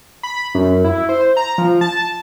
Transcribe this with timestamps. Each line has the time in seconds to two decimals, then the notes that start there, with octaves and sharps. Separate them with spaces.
0.23 B5
0.55 F#2
0.84 E4
1.09 C5
1.37 A#5
1.58 F3
1.81 A5